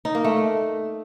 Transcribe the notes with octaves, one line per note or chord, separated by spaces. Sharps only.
D#4
A#3
A3